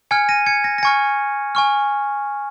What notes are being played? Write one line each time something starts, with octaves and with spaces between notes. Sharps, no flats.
G#5 F6 G#6 C#7
A#6 D#7
G#6 C#7
A#6
A#6
G#5 C#6 F6 G#6 C#7
G#5 C#6 F6